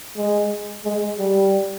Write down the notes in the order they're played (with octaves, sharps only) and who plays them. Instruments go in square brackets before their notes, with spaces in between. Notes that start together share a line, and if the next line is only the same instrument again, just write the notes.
[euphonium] G#3
G#3
G3